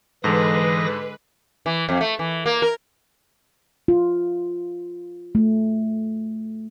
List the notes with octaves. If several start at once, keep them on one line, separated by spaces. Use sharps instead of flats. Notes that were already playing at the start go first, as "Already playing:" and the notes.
G#2 D3 E3 G#3 A4 B4 D#6 A#6
E3
F2
A3
E3
A#3
A#4
F4
A3